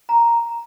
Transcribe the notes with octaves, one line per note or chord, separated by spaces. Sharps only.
A#5